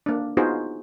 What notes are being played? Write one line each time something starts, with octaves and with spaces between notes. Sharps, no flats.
A#3 D4
B3 D#4 F4 F#4 G#4 C5